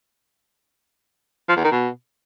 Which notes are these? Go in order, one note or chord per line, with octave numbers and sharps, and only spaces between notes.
F3
E2
D#3
B2